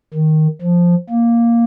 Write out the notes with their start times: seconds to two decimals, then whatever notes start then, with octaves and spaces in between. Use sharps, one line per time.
0.14 D#3
0.62 F3
1.10 A#3